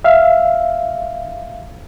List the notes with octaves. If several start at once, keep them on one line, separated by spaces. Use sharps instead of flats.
E5 F5